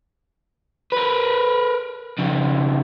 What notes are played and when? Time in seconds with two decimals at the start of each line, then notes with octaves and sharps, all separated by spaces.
0.92 A#4 B4
2.19 F2 C#3